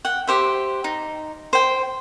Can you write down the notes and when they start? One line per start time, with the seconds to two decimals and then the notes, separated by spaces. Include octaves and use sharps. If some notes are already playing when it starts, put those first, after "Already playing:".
0.05 F#5 G5
0.27 G4 C5 E5
0.84 D#4
1.53 C5 G5